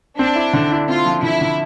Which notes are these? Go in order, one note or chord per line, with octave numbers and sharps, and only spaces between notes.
C4 D4
E4
D3
E4
C4 F4
F3
D3 E4
D3